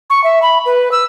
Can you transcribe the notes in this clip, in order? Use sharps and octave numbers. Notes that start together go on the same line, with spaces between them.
C#6
E5
B5
B4
E6